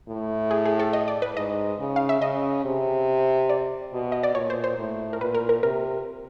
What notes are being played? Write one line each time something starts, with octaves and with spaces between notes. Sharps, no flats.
A2
G#4
G#4
A4
D#5
D5
B4
G#2 D#5
C#3
F5
E5
C#3 D#5
C3
D5
B2
D#5
D5
A#2 C#5
C5
C5
A2
A#4
A#2 B4
A#4
A#4
C3 A#4